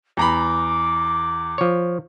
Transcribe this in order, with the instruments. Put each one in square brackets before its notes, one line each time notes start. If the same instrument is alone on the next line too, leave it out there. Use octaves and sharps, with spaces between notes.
[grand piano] E2 A#5 B5 [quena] D6
[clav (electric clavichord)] F3 C#5